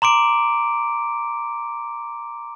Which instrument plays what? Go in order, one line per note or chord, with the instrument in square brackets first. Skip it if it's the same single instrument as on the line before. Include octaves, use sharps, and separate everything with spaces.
[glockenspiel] A#5 C6 D6 D7